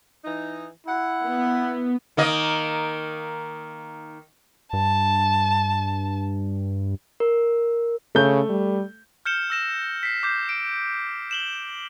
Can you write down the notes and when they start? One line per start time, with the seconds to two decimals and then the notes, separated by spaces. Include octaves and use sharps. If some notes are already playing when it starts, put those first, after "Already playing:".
0.25 E3 D#4
0.87 E4 F#5
1.25 B3
2.17 D#3 A#3 D#5
4.73 G2 A5
7.20 A#4
8.15 C#3 A3 G6
8.49 G3
9.25 F6 G6 C#7 E7 G7
9.50 E6 A#6 E7
10.03 B6 C7
10.23 D6 G6 C7
10.49 D7
11.31 E7 F#7 G7